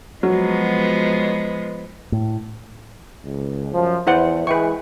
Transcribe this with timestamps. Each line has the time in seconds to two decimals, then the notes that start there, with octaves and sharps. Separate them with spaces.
0.23 F3 F#3 G#3 B3
2.12 A2
3.25 C#2
3.73 F#2 F3
4.07 E2 E4 C5 F#5
4.47 E3 G#3 B4 G5 C#6